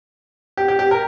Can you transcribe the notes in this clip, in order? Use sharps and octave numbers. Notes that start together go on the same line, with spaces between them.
G4
G4
G4
A#4